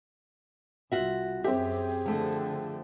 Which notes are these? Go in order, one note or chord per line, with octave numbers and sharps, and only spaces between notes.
C2 F4 F#4 E5
F#2 C4 G4 G#4 E5
D3 F3 A3